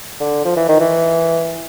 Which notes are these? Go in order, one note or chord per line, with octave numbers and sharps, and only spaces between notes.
D3
F3
E3
D#3
E3